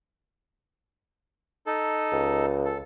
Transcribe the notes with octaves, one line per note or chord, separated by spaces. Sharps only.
D#4 A4
C#2
A4